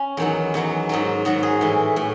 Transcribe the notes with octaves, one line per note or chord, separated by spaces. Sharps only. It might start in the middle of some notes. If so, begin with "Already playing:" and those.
Already playing: C#4
E2 D#3 F#3
E2 D#3 F#3
G#2 D#3 F#3
G#2 D#3 F#3 F#4
G#4
A2 E3
A2